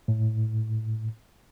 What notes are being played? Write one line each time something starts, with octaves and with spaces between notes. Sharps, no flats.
A2